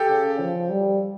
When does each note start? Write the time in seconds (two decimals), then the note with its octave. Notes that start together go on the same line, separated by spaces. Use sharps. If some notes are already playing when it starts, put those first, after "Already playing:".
Already playing: G4 A4
0.08 C#3
0.39 F3
0.70 G3